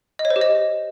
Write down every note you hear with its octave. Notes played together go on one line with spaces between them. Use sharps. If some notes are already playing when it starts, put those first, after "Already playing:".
D#5
C#5
C5
G4
D#5